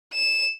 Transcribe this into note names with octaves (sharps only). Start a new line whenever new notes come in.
E7